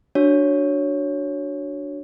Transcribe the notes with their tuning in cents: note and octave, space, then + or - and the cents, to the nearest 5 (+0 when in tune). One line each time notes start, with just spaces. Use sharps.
D4 +0 F#4 +0 C#5 +0